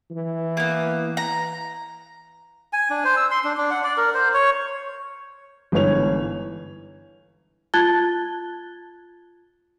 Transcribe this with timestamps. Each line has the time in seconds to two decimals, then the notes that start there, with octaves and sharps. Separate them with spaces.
0.11 E3
0.57 A#3 B3
1.17 A#5
2.73 G#5
2.90 D4
3.05 C5
3.17 E6
3.31 C6
3.44 D4
3.57 D4
3.71 F#5
3.84 D5
3.97 A#4
4.14 C5
4.34 C#5
5.72 G1 G#2 E3 C#5 F7
7.74 F4 A5 F#6 G#6 A6 G7